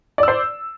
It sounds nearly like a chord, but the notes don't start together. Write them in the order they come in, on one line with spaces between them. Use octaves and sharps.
D5 E6 C5